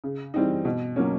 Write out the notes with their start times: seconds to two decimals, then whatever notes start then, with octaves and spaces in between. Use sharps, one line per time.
0.04 C#3
0.34 E3 G3 C4 D#4
0.65 B2
0.96 F#3 A#3 C#4